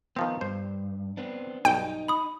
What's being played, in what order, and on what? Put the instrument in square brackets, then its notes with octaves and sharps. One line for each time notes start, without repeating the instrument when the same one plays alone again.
[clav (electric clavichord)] D#3 F3 C4 [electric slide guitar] B3
[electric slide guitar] G2 [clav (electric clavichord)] C5
[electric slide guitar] B3 C4 D4
[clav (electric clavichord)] B1 G2 [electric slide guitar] D#4 [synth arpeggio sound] G5
[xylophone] B5 D#6